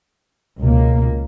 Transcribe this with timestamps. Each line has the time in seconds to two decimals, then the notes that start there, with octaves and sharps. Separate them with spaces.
0.62 C#2 B2 A#3